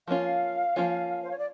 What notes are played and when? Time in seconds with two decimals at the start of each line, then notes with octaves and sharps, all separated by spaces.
0.08 F3 A#3 C#4 F4 F5
0.76 F3 A#3 C#4 F4
1.23 C5
1.30 C#5
1.37 D5